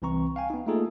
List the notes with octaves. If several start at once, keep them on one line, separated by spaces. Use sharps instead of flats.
C2 E3 C4 A#5 C#6
F5 G5 G#5
B3 D#4
A3 A#3 D#4 F4 G#4 A4